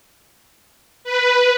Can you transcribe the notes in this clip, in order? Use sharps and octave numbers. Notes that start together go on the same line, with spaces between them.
B4